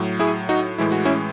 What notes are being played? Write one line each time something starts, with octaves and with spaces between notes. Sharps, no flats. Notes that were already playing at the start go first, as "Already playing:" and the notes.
Already playing: A2 F#3
E4 G#4
D#4 F#4
A2 E3 G#3 E4
F#4
C#4 E4